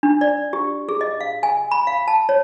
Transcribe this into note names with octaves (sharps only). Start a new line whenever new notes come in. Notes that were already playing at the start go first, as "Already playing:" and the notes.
D4
D5
G4
G#4
D#5
F5
G#5
B5
F5
A5
C#5